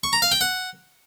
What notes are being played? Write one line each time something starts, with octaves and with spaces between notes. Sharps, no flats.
C#6
A#5
F5
G5
F#5